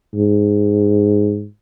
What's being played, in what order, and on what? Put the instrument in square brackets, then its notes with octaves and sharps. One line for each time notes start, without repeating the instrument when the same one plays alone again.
[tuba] G#2